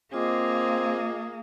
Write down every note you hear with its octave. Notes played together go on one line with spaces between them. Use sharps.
A#3 C4 F4 G#4 D#5 D6